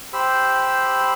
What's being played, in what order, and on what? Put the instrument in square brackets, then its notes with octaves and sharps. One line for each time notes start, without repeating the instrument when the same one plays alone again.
[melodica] G4 C5 B5 E6